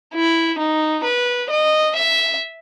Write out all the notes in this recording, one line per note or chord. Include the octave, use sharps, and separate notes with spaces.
E4
D#4
B4
D#5
E5